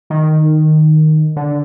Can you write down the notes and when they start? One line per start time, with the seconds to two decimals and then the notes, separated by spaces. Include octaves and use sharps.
0.10 D#3
1.36 D3